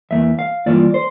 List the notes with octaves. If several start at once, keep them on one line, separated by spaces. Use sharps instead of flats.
E2 E3 A#3 E5
F5
G2 E3 A#3 F4 D5
C5